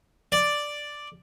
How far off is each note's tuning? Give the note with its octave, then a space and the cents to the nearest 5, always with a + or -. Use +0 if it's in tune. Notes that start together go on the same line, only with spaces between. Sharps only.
D5 +0